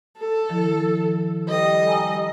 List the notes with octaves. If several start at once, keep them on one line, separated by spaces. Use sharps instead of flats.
A4
D#3 F3 E4
G3 A4 D#5 G5
G#5 A#5 E6